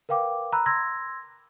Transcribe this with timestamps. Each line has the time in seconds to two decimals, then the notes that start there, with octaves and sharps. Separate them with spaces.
0.09 A#4 B4 F5 G5 D6
0.52 A#5 B5 E6 F#6
0.66 C6 E6 G#6 A#6